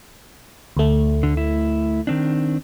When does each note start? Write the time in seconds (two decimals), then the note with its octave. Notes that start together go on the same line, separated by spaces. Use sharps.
0.77 D2 A3
1.23 D3
1.37 E4
2.07 D#3 C4 D4